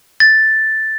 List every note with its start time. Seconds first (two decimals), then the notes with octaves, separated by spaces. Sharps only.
0.20 A6